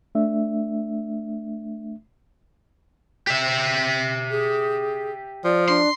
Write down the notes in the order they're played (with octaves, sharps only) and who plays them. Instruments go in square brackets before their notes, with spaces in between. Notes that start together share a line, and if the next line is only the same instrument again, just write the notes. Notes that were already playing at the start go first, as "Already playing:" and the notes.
[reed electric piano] A3 D4 E5
[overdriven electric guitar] G4 E5
[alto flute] G#4
[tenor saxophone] F3 [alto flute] D5
[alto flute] D4 [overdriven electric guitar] C6